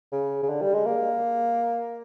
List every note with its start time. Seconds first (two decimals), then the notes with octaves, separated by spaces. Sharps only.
0.12 C#3
0.43 C#3
0.49 D3
0.62 G3
0.74 G#3
0.86 A#3